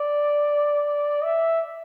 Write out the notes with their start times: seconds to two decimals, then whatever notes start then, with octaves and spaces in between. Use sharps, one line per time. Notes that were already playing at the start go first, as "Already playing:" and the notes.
Already playing: D5
1.24 E5